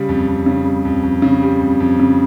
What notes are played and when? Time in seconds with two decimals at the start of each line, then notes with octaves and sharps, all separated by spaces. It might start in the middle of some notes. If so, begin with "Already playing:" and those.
Already playing: C#3 G3
0.09 F2
0.28 F2
0.46 C#3
0.65 G3
0.85 F2
1.03 F2
1.22 C#3
1.42 G3
1.61 F2
1.80 F2
2.00 C#3